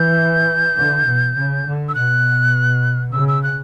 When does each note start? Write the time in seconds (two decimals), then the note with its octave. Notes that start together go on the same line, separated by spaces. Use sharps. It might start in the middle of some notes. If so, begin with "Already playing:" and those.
Already playing: E3 G6
0.75 D3
1.04 B2
1.35 C#3
1.65 D3
1.89 E6
1.95 B2 F#6
3.13 C#3 E6
3.28 E6
3.43 F#6